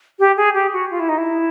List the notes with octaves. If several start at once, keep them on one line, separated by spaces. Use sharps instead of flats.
G4
G#4
G4
F#4
F4
E4
D#4
E4